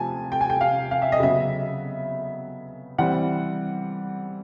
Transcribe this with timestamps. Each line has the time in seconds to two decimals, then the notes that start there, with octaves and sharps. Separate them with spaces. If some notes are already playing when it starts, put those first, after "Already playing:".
Already playing: C3 F3 A3 G#5 A5
0.32 G5
0.41 G#5
0.50 G5
0.61 F5
0.91 F5
1.02 E5
1.12 D#5
1.20 C#3 F#3 B3 E5
2.98 E3 G3 C4 F#5